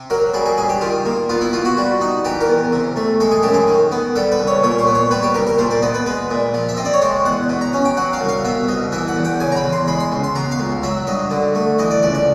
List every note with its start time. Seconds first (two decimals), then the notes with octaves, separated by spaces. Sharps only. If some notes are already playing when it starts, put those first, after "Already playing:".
Already playing: C3
0.10 F#3 A#4
0.34 G3 G#4
0.46 G#4
0.58 G2 G#4
0.69 G4
0.81 D#3 F4
1.05 A#3
1.29 B3 F4
1.41 E4
1.53 B2 F4
1.65 F#4
1.77 G3
2.01 D#4
2.25 E3 G4
2.41 A#4
2.48 E2
2.72 C3
2.96 A3
3.20 G#3 A4
3.31 G#4
3.43 F#2 G4
3.54 G#4
3.67 D#3
3.92 B3
4.16 G3 A4
4.32 B4
4.39 C2
4.47 C#5
4.63 A#2 C#5
4.79 C5
4.87 B3
4.95 C#5
5.11 G3 B4
5.23 G4
5.34 C2 A#4
5.47 A#4
5.58 A#2 C5
5.71 D5
5.82 B3 D#5
5.94 B4
6.06 G#3 B4
6.31 A#2
6.54 F3
6.69 E5
6.77 C4 D#5
6.85 D5
6.93 C#5
7.02 G#3 C5
7.25 E2 F#5
7.49 B2
7.61 A#5
7.73 C#4
7.85 G5
7.97 F#3 F#5
8.13 F5
8.21 C2
8.29 F5
8.45 B2 E5
8.68 C2 D#5
8.92 E3 E5
9.08 F#5
9.16 E2
9.25 G5
9.40 C#3 G#5
9.52 A#5
9.56 B5
9.64 E2
9.72 C6
9.88 G#3 B5
10.00 C6
10.12 C#2
10.24 C6
10.35 B2 A#5
10.51 F5
10.60 C#2
10.83 F#3 E5
11.07 G2 D#5
11.31 D3
11.55 A3
11.79 E3 D#5
11.91 D5
12.03 C#2 D5
12.15 D5